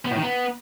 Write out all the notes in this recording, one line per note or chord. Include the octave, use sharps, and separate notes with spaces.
B3
A2
D#3
B3